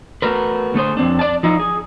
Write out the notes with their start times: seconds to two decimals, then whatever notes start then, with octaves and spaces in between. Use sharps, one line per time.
0.22 A3 F#4 A#4 B4
0.74 D3 A3 G#4 C5
0.97 F2 C4 D4
1.19 D5 A5
1.43 F3 D#4 E4
1.59 G#4